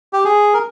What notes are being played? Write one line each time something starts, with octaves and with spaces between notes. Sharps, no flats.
G4
G#4
A#4